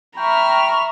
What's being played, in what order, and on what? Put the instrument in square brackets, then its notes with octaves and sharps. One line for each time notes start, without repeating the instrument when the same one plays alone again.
[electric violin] E5 A#5 [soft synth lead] G5 [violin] B5 F6 [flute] C#6